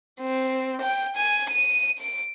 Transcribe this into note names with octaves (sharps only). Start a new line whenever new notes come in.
C4
G5
G#5
D#7
D7